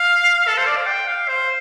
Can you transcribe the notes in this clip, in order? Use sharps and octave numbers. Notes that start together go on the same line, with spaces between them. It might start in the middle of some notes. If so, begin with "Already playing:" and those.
Already playing: F5
A4
C5
D5
F5
G5
F5
C5